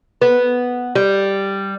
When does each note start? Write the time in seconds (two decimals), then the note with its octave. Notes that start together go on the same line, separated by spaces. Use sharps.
0.21 B3
0.95 G3